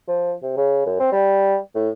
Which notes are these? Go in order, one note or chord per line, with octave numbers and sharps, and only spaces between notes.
F3
C3
C#3
F#2
C4
G3
A2